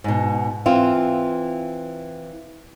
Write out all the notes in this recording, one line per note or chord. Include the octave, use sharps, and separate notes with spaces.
G#2 B2
E3 C4 F4